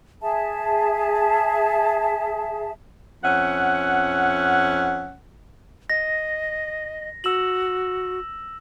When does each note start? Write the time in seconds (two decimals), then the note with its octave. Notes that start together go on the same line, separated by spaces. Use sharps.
0.21 G#4 E5 A5
3.23 F2 C#4 E5 F#5
5.90 D#5 A#6
7.24 F#4 E6 E7 F#7